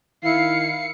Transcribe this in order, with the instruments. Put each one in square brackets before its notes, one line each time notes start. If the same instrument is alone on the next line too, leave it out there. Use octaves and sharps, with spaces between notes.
[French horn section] D#3 [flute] E4 [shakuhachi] F5 [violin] C7 C#7